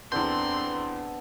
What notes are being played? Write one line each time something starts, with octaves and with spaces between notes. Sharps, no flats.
E2 B3 C4 D4 A4 B5 C6 G6